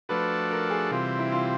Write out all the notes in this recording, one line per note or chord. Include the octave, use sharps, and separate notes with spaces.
F3 A3 D4 F#4 A4 B4
A#4
G#4
C3 E3 G3 C4 F4
E4
F4